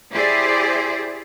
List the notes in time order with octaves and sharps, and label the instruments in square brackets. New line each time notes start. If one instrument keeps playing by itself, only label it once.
[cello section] E4 G4 G#4 C5 D5